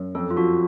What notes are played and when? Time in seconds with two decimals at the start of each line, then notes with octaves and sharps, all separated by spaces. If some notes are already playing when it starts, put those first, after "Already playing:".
Already playing: F#2
0.15 F2 A4
0.31 F4
0.36 F3 F#4